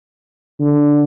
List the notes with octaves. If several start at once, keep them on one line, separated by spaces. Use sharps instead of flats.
D3